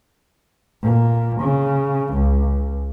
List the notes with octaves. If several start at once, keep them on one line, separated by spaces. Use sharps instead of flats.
A#2
C#3
C#2